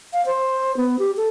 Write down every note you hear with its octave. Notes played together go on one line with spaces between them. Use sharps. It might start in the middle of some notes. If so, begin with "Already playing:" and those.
F5
C5
B3
G4
A4